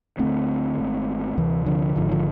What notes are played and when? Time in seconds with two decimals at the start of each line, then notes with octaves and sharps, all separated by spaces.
0.19 D2 D3 A3 C4
0.78 G#1 G#2
1.37 D2 C3 E3
1.66 D3 F3
1.96 G#1 G#2 D3 F3
2.11 D3 F3